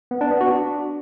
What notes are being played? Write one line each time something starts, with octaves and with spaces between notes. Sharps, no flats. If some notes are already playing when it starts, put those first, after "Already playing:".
B3
D4
B3
F#4
D4